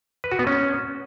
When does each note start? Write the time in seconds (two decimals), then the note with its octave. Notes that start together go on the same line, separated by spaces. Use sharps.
0.24 B4
0.32 F#4
0.39 B3
0.47 C#4